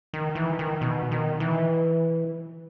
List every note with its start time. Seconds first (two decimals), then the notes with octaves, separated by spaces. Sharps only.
0.14 D#3
0.35 E3
0.59 D#3
0.81 B2
1.11 D#3
1.40 E3